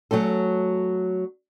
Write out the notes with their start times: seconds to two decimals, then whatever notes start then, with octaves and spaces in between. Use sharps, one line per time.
0.11 F#3 A3 C#4 A4